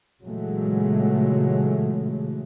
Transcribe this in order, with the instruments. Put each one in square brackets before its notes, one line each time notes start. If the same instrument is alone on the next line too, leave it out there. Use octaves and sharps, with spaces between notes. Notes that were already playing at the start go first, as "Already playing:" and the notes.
[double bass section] A#2 C#3 E3 F#3 G#3 A3